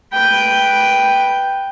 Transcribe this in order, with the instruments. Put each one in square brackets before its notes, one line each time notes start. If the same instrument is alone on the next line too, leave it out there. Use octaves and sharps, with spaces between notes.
[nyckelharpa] B4 G5